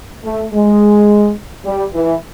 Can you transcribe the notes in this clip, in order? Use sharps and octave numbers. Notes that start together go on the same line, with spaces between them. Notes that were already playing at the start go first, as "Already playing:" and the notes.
A3
G#3
G3
E3